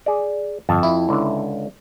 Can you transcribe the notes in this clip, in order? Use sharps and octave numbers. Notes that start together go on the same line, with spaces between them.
G#4 D5
G1 F2 A5
E4
C#2 D3